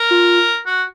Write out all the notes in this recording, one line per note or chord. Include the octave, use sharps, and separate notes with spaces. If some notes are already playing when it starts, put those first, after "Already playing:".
Already playing: A#4
F4
F#4